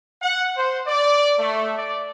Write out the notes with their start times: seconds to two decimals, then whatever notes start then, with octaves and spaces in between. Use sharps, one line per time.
0.22 F#5
0.57 C5
0.87 D5
1.39 A3
1.78 D5